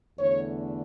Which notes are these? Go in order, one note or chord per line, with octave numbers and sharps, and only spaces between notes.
E2 D3 A3 C#5